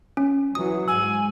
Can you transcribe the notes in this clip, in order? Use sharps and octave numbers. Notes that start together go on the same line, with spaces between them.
C#4
E3 F#3 D#6
G#2 G#5 E6